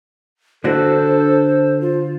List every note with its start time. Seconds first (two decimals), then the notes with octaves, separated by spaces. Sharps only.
0.64 D3 D4 F#4 A4 C5
1.81 F4